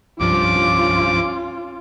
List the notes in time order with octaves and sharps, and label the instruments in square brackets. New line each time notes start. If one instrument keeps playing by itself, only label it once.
[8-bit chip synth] C2 G2 F3 [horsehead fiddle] C#4 F4 [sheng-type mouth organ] D6